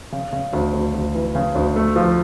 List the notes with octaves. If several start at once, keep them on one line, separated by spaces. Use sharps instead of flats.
C#3
C#3
D2
D2
D2
E3
C#3
D2
A3
F3